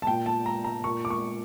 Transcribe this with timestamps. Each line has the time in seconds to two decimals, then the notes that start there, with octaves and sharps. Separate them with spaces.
0.02 A5
0.07 A#2 G5
0.26 A5
0.46 A#5
0.64 A#5
0.84 A#2 C#6
1.05 D6
1.10 C#6